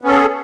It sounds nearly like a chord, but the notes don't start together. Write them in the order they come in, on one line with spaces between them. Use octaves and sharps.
B3 C#4 A4 G#4